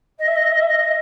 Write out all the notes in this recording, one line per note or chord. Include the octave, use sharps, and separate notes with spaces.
D#5
E5
D#5
E5
D#5
E5
D#5
D#5